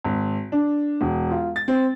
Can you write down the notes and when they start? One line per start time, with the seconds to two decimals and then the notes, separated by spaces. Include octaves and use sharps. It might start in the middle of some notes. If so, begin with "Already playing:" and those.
0.04 G#1
0.52 D4
1.01 E1
1.31 F4
1.56 A6
1.68 C4